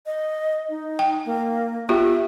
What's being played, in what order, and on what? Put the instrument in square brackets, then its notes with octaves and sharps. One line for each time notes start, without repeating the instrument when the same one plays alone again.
[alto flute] D#5
D#4
[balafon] G5
[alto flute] A#3
[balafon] B3 F4 G4 [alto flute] E5